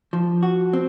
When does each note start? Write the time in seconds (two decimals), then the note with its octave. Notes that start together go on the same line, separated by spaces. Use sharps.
0.13 F3
0.43 F#4
0.73 C4